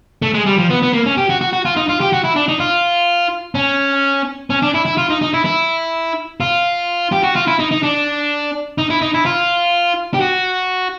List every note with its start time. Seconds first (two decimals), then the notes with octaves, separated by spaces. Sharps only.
0.22 A3
0.34 G#3
0.46 G3
0.58 F3
0.70 B3
0.82 B3
0.93 A#3
1.06 C#4
1.17 G4
1.29 F#4
1.41 F#4
1.53 F#4
1.65 F4
1.76 D#4
1.89 F4
2.01 G4
2.13 F#4
2.24 E4
2.36 D4
2.48 D#4
2.60 F4
3.55 C#4
4.50 C#4
4.62 D4
4.74 E4
4.85 E4
4.97 F4
5.10 D#4
5.22 D#4
5.34 E4
5.45 E4
6.40 F4
7.12 G4
7.23 F#4
7.36 F4
7.47 E4
7.59 D#4
7.71 D#4
7.83 D4
8.78 D#4
8.90 E4
9.02 D#4
9.14 E4
9.25 F4
10.14 G4
10.21 F#4